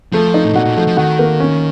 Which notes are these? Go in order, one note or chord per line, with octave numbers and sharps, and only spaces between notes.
F3 A3
D#4
A2
A#2 F#4
A#2
F3 A3
F3
D#3 F#4
A#3
C#4